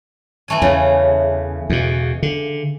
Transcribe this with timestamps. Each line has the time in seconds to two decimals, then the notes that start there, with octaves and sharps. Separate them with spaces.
0.48 E3 A3 G#5
0.62 E2 C#3
1.70 E2 B2
2.22 D3